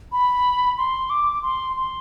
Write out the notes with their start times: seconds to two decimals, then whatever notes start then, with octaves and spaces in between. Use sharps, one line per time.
0.12 B5
0.78 C6
1.10 D6
1.43 C6
1.76 C6